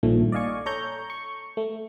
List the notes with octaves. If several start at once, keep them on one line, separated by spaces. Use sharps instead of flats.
A#1 G2 A#2 D#3 F3 A3
D5 D#5 F5 G#5 C#6
A4 C#5 A#5 C#6 G6
C#6
A3